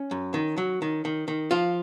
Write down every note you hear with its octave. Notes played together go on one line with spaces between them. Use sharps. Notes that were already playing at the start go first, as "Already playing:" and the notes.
Already playing: C#4
F#2
D#3
F#3
D#3
D#3
D#3
F3 F4